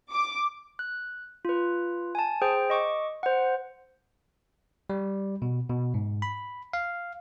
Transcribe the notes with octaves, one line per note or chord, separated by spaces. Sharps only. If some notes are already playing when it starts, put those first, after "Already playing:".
D6
F#6
F4 B4
G#5 A5
G#4 C5 G5
D#5 C#6 D6
C5 F#5
G3
B2
B2
G#2
B5
F5